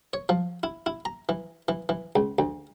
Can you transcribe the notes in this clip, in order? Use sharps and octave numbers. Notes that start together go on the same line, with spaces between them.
C#5
F3
E4
E4
A#5
E3
E3
E3
C#2
D2